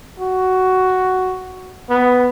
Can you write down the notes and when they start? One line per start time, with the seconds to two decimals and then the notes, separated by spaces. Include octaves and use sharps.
0.20 F#4
1.90 B3